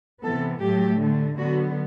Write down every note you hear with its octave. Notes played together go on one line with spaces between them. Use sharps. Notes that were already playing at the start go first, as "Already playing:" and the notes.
C3 E3 B3 A4
A2 F#3 A3 G4
D3 A3
D3 F#3 B3 F#4